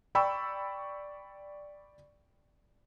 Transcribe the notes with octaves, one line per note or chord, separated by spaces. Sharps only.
D5 G5 B5 C#6 E6